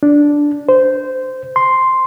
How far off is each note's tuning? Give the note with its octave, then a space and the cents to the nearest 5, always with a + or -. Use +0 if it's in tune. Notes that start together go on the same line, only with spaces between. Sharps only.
D4 -5
C5 -15
C6 +0